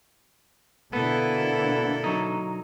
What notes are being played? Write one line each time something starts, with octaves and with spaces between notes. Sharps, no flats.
B2 D3 A#3 B3 E4 A4
F#3 D#4